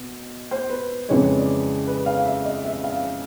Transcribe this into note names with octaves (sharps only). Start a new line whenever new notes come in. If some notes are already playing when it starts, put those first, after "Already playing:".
Already playing: B2
C5
B4
F2 C#3 E3 G#3 C#5
D5
B4
F5
E5
D#5
E5
F5